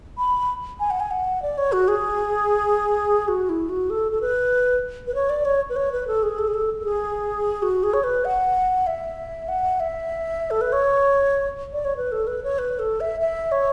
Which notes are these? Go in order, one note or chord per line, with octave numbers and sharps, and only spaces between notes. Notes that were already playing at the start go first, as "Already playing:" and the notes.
B5
G#5
F#5
G#5
F#5
D5
C#5
F#4
G#4
F#4
E4
F#4
A4
A4
B4
B4
C#5
D5
C#5
B4
C#5
B4
A4
G#4
A4
G#4
A4
A4
G#4
F#4
G#4
C#5
B4
F#5
E5
F#5
E5
A4
B4
C#5
D5
C#5
B4
A4
B4
C#5
B4
A4
E5
E5
C#5